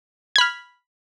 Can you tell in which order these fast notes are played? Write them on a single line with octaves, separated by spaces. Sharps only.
G#6 B5 F6